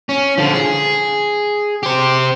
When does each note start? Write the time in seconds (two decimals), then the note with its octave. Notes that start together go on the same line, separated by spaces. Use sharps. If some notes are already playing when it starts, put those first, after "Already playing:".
0.09 C#4
0.38 D3 F3
0.54 G#4
1.83 G4 C5